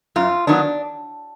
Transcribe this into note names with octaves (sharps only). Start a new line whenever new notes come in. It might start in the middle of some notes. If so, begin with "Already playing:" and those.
F#2 F4
D#3 F#3 B3 D4